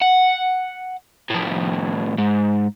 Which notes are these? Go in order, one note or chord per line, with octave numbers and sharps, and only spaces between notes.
F#5
A2 F3
G#2